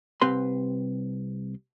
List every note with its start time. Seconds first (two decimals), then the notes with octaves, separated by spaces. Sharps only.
0.21 C2 C4 G4 B4 C6